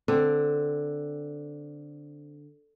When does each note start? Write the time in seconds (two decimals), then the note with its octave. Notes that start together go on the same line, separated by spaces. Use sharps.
0.08 D3 C4